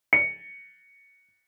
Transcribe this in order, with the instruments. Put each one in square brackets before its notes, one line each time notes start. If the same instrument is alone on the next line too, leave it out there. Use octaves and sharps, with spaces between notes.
[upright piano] C#7